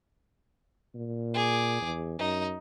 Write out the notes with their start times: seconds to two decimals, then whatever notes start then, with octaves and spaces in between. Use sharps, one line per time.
0.95 A#2
1.34 G#4 D6
1.81 E2
2.19 F#2 D#4